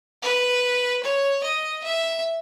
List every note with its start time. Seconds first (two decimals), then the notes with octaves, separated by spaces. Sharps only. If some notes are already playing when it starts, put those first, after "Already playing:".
0.22 B4
1.03 C#5
1.44 D#5
1.84 E5